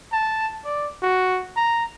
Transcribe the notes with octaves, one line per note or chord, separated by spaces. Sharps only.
A5
D5
F#4
A#5